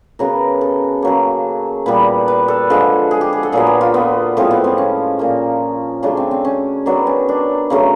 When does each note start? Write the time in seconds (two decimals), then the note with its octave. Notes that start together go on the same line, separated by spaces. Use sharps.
0.19 C#3 F#3 B3 A#4
0.61 A4
1.02 C#3 F#3 A#3
1.86 A#2 G3 B3 B4
2.28 B4
2.48 A4
2.70 D3 F3 G#3
3.11 G#4
3.21 G4
3.33 G#4
3.43 A4
3.52 A#2 F#3 B3 G#4
3.67 G4
3.81 F4
3.94 B3
4.37 A2 F3 G#3 C4
4.51 B3
4.64 C4
4.78 C#4
5.19 A#2 F3 A#3
6.03 C#3 F#3 A3 D4
6.17 C4
6.31 C4
6.45 C#4
6.86 D#3 F#3 B3 D4
7.07 C#4
7.29 D4
7.70 C#3 F#3 A3